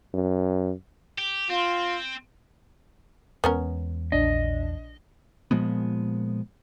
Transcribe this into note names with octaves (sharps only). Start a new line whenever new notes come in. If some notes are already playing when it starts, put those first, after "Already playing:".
F#2
G4
C4 F4
E2 G#3 B3 C#4 A#4
A#1 D4 D#5
A#2 F3 G#3 B3